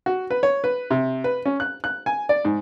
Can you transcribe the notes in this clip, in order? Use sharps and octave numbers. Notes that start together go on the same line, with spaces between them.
F#4
B4
C#5
B4
C3
B4
C#4
F#6
F#6
G#5
D5
G#2